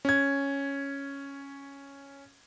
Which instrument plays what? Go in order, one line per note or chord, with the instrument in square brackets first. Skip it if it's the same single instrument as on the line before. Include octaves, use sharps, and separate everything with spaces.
[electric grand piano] C#4 G#6